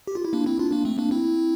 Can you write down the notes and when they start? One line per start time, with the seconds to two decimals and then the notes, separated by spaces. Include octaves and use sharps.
0.07 G4
0.15 F4
0.25 E4
0.33 A#3 D4
0.46 C4 E4
0.59 D4 F4
0.72 A#3 D4
0.85 A3 C4
0.98 A#3 D4
1.11 C4 E4